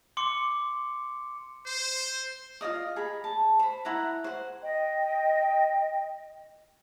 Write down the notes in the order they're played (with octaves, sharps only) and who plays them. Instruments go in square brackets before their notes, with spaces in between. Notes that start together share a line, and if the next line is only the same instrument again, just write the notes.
[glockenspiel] C6 D6 C#7
[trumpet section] C5
[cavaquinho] F4 D5 D#5 D#6
G#4 A#5 B5
A5
C5 B5
E4 F#5 A#5
C5 F#5
[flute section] D#5 G5